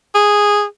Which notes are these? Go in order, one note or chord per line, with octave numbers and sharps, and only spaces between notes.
G#4